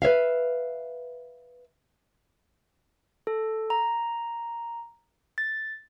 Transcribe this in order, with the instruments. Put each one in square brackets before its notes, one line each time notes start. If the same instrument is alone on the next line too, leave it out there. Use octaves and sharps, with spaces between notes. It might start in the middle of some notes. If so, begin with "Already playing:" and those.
[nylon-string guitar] B4 C#5 E5 F5
[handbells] A4
A#5
A6